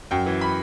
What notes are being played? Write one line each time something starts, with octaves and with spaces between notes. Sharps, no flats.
F#2 G5
E3
B5